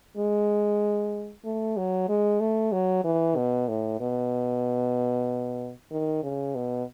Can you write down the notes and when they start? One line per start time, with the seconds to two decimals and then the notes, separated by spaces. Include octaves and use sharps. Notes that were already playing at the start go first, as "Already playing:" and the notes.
0.17 G#3
1.45 A3
1.77 F#3
2.09 G#3
2.40 A3
2.72 F#3
3.04 E3
3.36 B2
3.68 A2
4.00 B2
5.91 D#3
6.23 C#3
6.55 B2